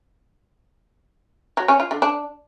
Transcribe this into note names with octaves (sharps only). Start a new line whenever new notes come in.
F#3
C#4
F4
D3
D4